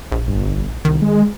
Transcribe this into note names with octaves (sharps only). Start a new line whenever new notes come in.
A#1
G1
C2 D#3
G#3